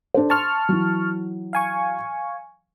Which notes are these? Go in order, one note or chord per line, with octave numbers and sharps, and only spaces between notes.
D4 A4 C5
A5 C6 C#6 F6
E3 F#3
F5 G#5 C#6